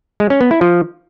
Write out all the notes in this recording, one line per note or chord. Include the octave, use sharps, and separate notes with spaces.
G#3
C#4
B3
E4
F3